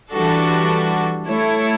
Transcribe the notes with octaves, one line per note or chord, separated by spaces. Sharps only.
E3 G3 D4 F#4 A4
A3 E4 A4 C#5